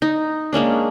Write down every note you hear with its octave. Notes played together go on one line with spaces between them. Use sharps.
D#4
G#3 A#3 C#4 D4